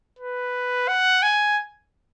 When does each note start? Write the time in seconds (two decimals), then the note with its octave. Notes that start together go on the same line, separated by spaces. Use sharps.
0.19 B4
0.88 F#5
1.23 G#5